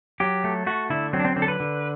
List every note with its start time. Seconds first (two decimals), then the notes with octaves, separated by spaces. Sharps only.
0.20 F#3 G4
0.44 A3
0.66 A3 F#4
0.90 D3 E4
1.13 F#3 C4
1.19 D4
1.25 C4
1.36 D3 C4
1.42 A4
1.48 B4
1.60 D3